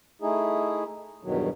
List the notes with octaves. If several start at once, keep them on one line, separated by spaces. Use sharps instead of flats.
A3 D#4 E4 G#4
E2 G2 B2 D#3 F#3